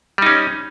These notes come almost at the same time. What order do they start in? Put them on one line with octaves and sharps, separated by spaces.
G3 D#4 C#4